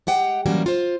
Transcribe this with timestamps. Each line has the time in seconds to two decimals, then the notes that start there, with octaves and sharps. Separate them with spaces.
0.07 G#3 G4 F#5 G5
0.46 E3 F#3 G3 A#3 C#4 F#4
0.66 F4 C5